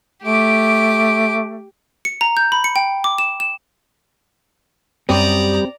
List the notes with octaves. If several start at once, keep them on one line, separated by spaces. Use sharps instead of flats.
A3 G4 D6
C#7
A#5
G6
B5
C#7
G5
D6
E7
E7
F#2 G3 C4 G4 D5 A#5 D#6